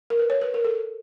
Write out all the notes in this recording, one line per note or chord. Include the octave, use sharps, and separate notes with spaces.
A#4
B4
C#5
B4
A#4
A4